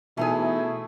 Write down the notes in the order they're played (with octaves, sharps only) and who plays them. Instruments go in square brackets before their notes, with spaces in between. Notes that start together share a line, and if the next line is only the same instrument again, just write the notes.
[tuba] B2 [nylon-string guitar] E3 D#4 G#5 [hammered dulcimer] A3 G#4 [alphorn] E4